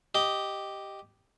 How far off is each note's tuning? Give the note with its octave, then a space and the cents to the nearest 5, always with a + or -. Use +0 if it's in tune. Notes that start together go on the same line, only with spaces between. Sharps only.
G4 +0 D#5 +0